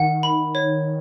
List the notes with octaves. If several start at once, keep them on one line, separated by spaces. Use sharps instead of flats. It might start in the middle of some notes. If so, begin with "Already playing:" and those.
Already playing: D#3 F#5
B5
C#5